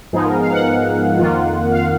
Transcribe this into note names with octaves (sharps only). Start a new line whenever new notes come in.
G#2 F3 B3 D#4 G#4
A#4
F5
F#5
F2 D#3 A#3 F4
F5